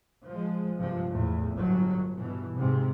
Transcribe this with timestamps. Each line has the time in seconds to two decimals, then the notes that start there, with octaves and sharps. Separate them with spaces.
0.25 F3 G#3
0.77 G2 C3 F3
1.10 E2 A2
1.54 G1 F#3
2.19 G2 B2 E3
2.55 G#2 C3